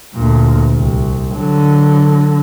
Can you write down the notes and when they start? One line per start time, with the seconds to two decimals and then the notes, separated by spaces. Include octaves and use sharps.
0.14 D2 A#2
0.73 C2
1.36 D3 F#3